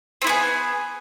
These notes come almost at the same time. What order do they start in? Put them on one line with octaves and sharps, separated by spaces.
C4 E4 B3 G#4